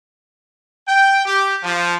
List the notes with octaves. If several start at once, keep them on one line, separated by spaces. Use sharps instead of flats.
G5
G4
F3